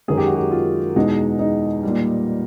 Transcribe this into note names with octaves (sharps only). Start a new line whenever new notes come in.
F#2 D#3 G#3 G#4
G4
F#4
G4
F4
E2 B2 G#3 D#4
D#4
A#2 G3